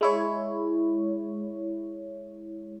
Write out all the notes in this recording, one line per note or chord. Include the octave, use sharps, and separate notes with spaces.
G#3 E4 C#5